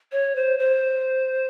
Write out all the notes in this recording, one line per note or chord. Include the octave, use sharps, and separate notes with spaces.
C#5
C5
C5